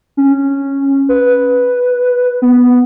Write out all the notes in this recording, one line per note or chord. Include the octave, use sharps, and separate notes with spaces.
C#4
B4
B3